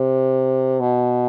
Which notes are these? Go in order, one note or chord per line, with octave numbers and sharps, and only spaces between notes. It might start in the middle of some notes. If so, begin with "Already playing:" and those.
Already playing: C3
B2